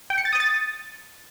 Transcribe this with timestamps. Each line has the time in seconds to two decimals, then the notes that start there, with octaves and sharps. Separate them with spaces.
0.10 G5
0.18 C#7
0.25 A6
0.33 D#6
0.40 A6